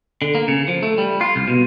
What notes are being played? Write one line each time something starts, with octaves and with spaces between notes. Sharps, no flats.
D3
A#3
C#3
F3
A3
G3
F4
C2
B2